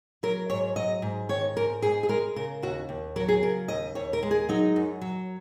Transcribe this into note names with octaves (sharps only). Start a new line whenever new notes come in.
F#3 A#4
G#2 C#5
F#3 D#5
G#2
D#3 C#5
G#2 A#4
G#2 G#4
G#4
G#3 A#4
C#3 A#4
D#2 F#4
D#2
F#3 A#4
G#4
C#3 A#4
D#2 D#5
D#2 C#5
A#4
G#3
G#4
F#3 D#4
F#2
F#3